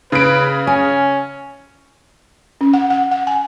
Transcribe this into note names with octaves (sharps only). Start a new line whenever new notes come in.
C#3 B4 D7
C#4 G#5
C#4
F#5
F#5
F#5
G#5